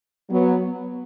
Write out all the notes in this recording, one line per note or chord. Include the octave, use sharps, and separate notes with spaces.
F#3 B3